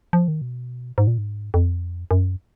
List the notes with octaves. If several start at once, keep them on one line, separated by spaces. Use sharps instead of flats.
F3
D#3
B2
G#2
A#2
G#2
F2
F#2